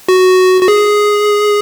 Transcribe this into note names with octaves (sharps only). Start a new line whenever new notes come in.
F#4
F#4
G#4